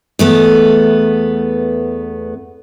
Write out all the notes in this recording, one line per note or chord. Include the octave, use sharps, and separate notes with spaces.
E2 A3 B3